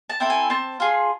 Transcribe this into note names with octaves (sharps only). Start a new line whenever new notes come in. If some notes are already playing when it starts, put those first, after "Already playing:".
A5
C4 E4 A4
G#5
C4 A5
F4 G#4